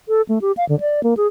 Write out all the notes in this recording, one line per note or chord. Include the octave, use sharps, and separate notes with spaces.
A4
A3
G4
F5
D3
D5
A#3
G#4